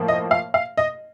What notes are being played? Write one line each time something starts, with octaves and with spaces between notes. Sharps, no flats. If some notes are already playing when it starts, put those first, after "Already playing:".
Already playing: A2 F3 A#3
D#5
F5
F5
D#5